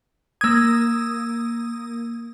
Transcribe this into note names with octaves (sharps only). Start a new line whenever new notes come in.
A#3 D#6 E6 G#6